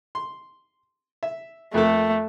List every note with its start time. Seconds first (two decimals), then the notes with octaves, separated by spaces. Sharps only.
0.15 C6
1.23 E5
1.74 F2 A3 A#3 A4